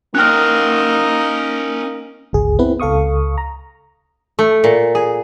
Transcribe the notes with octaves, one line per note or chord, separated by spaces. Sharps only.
A#3 C#4 D#4 A#4 G5 F6 F#6
G1 C#2 G#4
B3 C4 E4 B4
C#2 A4 F5 C#6 D#6
A#5
A3
A#2
G#4